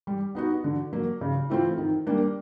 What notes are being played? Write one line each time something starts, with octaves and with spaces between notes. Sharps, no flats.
G3
B3 D#4 F#4
D3
F#3 A#3
C#3
E3 A3 C4 F4
D#3
G3 A#3 D4